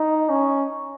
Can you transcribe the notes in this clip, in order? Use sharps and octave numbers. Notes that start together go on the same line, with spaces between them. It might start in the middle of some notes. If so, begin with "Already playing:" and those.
Already playing: D#4
C#4